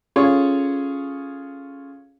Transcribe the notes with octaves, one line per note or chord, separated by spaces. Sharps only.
C#4 F4 G#4 A4 C#5